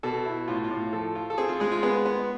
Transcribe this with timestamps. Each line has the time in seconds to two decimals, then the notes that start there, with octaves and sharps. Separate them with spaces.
0.03 B2 A4
0.26 E4
0.48 A2 F4
0.64 F4
0.71 A2
0.93 F3 A4
1.15 F4
1.30 A4
1.38 C4 G#4
1.49 F4
1.60 G#3 G#4
1.72 F4
1.83 B3 G#4
2.06 B3